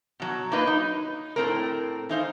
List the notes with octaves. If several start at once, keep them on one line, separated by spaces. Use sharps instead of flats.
B2 F#3
A#3 B3 D#4 F4 B4 D#5
D#4
A2 C4 A#4
E3 D#4 C5 F5